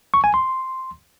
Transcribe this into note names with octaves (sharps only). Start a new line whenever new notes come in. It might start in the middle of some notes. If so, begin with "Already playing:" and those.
C#6
G#5
C6